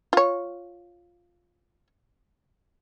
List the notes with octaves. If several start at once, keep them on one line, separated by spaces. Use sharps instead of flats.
F4 C#5